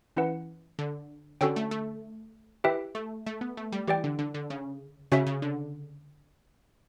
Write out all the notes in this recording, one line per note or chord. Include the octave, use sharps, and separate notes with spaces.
E3 C#4 E4 B4 F#5
D3
D3 C#4 F#4 A4 C#5 G5
A3
A3
E4 G4 B4 E5 G5
A3
A3
B3
A3
G3
E3 G4 D5 G5
D3
D3
D3
C#3
C#3 C#4 F#4 C#5 E5
C#3
D3